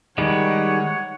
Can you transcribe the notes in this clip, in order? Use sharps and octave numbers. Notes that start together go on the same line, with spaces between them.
D#3 G3 G#3 C#5 F#5